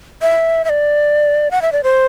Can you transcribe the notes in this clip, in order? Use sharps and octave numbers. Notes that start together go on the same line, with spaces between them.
E5
E5
D5
F#5
E5
D5
C5